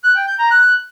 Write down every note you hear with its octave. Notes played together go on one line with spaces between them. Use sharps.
F#6
G5
G6
A#5
F#6